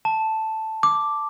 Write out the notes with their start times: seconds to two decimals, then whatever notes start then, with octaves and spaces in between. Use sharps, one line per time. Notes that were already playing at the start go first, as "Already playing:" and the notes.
0.05 A5
0.83 D6